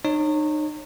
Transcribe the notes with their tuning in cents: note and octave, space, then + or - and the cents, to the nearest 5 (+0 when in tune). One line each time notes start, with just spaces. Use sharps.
D#4 -35 C#5 -20